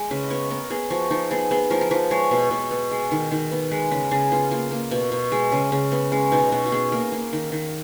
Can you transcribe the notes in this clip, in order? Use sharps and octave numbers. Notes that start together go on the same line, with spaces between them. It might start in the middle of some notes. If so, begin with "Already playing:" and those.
Already playing: G#3
C#3 B4
D#5
B3 C#5
B3 A#4
B3 G#4
F3 F#4
F3 D#4
B3 G#4
B3 G#4
F3 A#4
A#4
F3 B4
G#3 C#5
B2
B2
B3
G#3
D#3
D#3
B3
G#3 B4
C#3 B4
C#3 G#4
B3 F4
A#3 F4
A#3
B2
B2
G#3
C#3
C#3
B3
G#3 C#4
B2 D#4
B2 F#4
F#4
B3 G#4
A#3 A#4
A#3
D#3
D#3